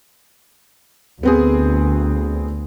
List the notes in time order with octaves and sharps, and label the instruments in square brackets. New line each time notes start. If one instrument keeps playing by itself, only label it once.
[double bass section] D2 [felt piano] B3 C4 G#4